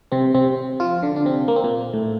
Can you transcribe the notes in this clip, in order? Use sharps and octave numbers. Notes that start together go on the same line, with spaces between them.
C3 C4
C3 C4
F3 F4
D3 D4
D4
C3 C4
A#3
C4
A#2 A#3
A2 A3